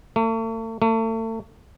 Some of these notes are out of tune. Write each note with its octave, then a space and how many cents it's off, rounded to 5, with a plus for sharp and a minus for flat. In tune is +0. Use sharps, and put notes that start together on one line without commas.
A3 +40
A3 +35